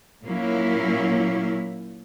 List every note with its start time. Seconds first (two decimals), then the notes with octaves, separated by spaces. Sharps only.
0.24 A#2 F#3 A#3 C#4 E4